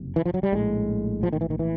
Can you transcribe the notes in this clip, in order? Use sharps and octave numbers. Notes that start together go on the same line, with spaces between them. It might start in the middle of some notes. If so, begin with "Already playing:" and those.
Already playing: F#1 F2 C3
E3
F3
F#3
G3
A#1 A2 G#3
F3
D#3
E3
D#3
E3